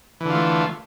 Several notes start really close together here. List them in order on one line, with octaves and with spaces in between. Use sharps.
E3 D3 F4 A3